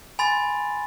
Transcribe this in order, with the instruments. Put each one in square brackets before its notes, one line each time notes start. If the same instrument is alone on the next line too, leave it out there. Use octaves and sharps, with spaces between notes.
[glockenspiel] G#5 B5 C6 A6